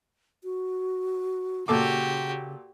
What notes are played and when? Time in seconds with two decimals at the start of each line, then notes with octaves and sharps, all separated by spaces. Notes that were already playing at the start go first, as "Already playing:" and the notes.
0.44 F#4
1.68 A#2 C#3 F#4 G4 A4 D6